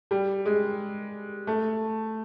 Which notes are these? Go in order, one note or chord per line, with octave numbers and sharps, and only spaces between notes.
G3
G#3
A3